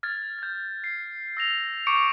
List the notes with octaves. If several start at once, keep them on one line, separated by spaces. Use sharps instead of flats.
F6 G#6 A6
G6 G#6
C7
E6 A#6 F7
C#6 D6 G6 C#7 D7